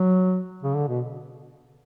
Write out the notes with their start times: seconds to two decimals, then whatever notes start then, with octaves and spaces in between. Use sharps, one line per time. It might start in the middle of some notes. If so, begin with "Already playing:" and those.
Already playing: F#3
0.63 C#3
0.76 D3
0.88 B2